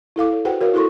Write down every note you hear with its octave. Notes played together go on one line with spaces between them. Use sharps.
E4 A4 F5 D6
A4 C#5
F#4 G#4 B4 C5 F#5 G5
F#4 A#4 C#5 F5
E4 F#4 G#4 A4 C6 C#6